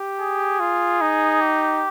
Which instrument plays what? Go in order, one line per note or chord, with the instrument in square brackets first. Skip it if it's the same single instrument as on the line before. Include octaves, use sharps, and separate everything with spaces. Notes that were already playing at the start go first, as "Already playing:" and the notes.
Already playing: [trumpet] G4
[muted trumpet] G#4
[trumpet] F4
D#4
[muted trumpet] G4